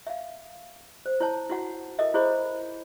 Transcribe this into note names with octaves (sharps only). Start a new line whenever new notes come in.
E5 F5
C5
E4 C#5 A5
E4 F#4 F#5
A4 A#4 D#5 E5
E4 G#4 C5 C#5 D#5 B5